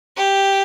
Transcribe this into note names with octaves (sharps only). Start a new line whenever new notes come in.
G4